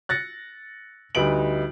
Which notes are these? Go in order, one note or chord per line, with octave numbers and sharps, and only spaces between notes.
F#6 A6 A#6 C#7
D2 G3 D#4 B4 D7 F#7